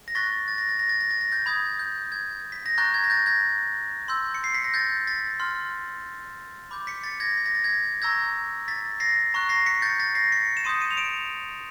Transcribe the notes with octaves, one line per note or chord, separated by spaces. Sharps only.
A#6
C#6 F#6 A6 B6
A6
A#6
A6
A#6
A6
A#6
A6
A#6
G6 A6
B5 D#6 G6 G#6
G6
G#6
B6
A#6
A#5 C#6 F#6 G6 A6
G#6
A#6
G6 A6
G#6 A#6
C6 E6 G6
C#7
C7
B6
A#6
G6 A6
A6 B6
C6 F6
B5 D6 G6
B6 C#7
A6 B6
G#6 A#6
B6
A#6
A6
G#6 A#6
A#5 C#6 E6 G6 G#6 A#6
A6 B6
A#6 C7
A#5 C#6 F#6
A#6 C7
B6 C#7
G6 A6
A6 B6
A#6 C7
B6 C#7
E7
C6 D#6 G6 C#7 D#7
C#7 D#7
F7
D7 E7